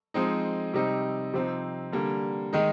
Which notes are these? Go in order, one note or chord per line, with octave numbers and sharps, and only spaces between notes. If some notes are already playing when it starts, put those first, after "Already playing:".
F3 G#3 C4 D#4
C3 G3 C4 D#4
C3 F3 C4 D#4
D3 G3 A#3
D#3 G#3 D#4